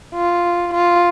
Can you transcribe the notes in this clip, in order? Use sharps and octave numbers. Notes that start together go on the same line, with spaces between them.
F4
F4